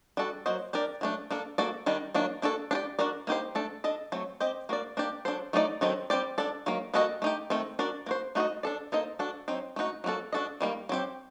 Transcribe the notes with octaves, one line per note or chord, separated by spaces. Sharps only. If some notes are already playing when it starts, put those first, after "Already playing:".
G3 D4 F#4 A4
F#3 A#3 F#4 C5 D#5
D4 G4 A#4 D5
F#3 A3 D4
A#3 D4 A4
A#3 F#4 A4 D5
D#3 G3 D4
D#3 F#3 A#3 D4
A#3 D4 F#4 A4
D4 G4 D5
D4 F#4 A#4 D5
A#3 D#4 G4 C5
A3 D4 A4
D4 A4 D#5
F#3 A3 C4
C4 G4 C5 D#5
A#3 F#4 A#4 D5
A#3 D4 G4 D5
F#3 A3 D4 A4 C5
F#3 A3 D#4 A4 D5
D#3 F#3 C4 D#4 A4
G3 C4 G4 D5
D4 A4 D5
D#3 F#3 A#3
G3 A#3 F#4 A4 D#5
A3 D#4 G4
D#3 A3 C4
D4 F#4 A#4 D5
A#3 F#4 C5
A3 D#4 F#4 C5 D#5
D4 A4 D5
A#3 D#4 A4 C5 D#5
D4 F#4 A4
F#3 C4 D#4
A3 D#4 F#4
F#3 A#3 F#4 A4
D4 F#4 A4 D#5
D#3 G3 A#3
F#3 C4 G4